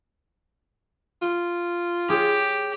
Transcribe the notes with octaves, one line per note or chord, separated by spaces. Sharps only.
F4
G4 G#4 C#5